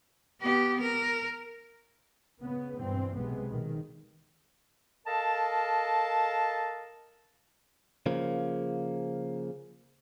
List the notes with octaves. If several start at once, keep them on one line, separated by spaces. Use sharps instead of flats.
B3 G4
A#4
C#3 B3
G2 B2 E3 C4
B1 C3 G#3 B3
B1 D#3
A4 A#4 D#5 F5 A5
C#3 F3 A#3